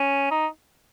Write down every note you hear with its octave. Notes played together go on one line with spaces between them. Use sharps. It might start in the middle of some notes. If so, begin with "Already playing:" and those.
Already playing: C#4
D#4